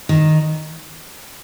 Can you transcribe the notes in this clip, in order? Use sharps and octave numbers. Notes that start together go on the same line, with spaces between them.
D#3